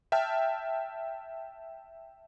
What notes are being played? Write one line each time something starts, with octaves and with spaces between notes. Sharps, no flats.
E5 G5 A5 F6